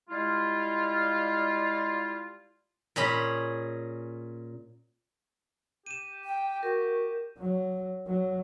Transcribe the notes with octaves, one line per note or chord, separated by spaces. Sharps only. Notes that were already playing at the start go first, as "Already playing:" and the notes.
G3 G#3 E4 F4
A#2 C#4 G#4 B5
G4 D#7 E7
G5
F#4 A#4
F#3
F#3